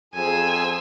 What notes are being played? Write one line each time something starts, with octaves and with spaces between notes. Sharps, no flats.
F2 G#4 C5 G#5 E6